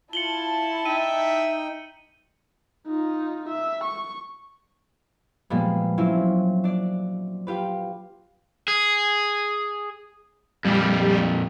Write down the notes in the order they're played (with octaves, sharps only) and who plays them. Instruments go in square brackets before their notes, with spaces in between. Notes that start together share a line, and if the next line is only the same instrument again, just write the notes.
[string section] E4 A5 [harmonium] F4 [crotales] C#7 F#7 G7
[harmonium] D#4 G5 [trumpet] E5 [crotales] D#7
[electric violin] D#4 F4
E5
C#6
[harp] A#2 F3 G3 G#3 A#3 B3
F#3 C4 C#4 E4 F4
D4 D5
F4 G4 B4
[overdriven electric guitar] G#4
[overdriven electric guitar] F2 A#2 [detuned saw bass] G3